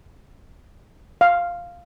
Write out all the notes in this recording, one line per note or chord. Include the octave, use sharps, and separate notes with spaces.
F5